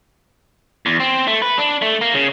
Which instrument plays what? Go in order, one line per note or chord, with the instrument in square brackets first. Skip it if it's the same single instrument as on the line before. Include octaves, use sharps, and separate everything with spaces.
[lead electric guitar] E2
C4
A3
B4
D4
A3
A#3
C#3